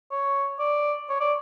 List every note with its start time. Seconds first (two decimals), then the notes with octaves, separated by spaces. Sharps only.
0.11 C#5
0.59 D5
1.09 C#5
1.21 D5